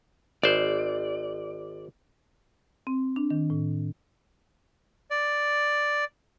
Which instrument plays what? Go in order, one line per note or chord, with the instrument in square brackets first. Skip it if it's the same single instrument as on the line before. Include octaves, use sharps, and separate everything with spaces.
[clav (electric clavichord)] G#1 C5 [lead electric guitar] D5
[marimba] C4
D4
D#3
A2
[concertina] D5